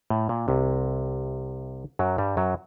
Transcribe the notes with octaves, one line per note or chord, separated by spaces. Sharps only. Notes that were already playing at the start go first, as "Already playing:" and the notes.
A2
A#2
C2 C3
F#2 F#3
G2 G3
F#2 F#3